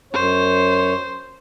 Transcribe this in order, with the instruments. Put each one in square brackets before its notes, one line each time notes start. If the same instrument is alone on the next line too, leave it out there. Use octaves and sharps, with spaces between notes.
[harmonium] F#2 C#5 [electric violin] C5